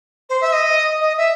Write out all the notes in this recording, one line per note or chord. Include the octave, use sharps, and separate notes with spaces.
C5
E5
D#5
D#5
E5